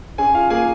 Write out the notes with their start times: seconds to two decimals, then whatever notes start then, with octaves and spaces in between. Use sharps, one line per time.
0.18 C#4 G#4 G#5
0.34 F4 F5
0.50 A#3 G#4 G#5